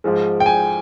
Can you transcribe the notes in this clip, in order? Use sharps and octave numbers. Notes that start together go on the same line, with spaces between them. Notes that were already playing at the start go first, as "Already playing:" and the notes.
G#2 F3 G#3
G5
G#5